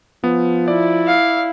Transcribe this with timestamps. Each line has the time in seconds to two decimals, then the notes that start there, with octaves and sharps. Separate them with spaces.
0.24 F3 B3
0.68 E4 D5
1.07 F5